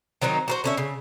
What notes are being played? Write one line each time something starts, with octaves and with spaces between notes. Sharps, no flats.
D#3 F#3 C4 D#4
F#4 A#4 C5
D3 C#4 E5
C#3